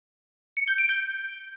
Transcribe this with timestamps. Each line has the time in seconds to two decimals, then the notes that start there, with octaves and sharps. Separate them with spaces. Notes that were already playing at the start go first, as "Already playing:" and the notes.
0.57 C#7
0.68 G6
0.78 D7
0.89 G6